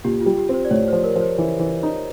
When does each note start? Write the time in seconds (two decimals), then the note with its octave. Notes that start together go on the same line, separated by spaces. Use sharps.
0.04 A#2 G4
0.21 F4
0.26 G3
0.37 G4
0.49 C4 C5
0.65 D5
0.71 A2 C#5
0.88 F3 C5
1.04 A#4
1.15 F3
1.21 C5
1.38 E3
1.59 E3
1.83 D#4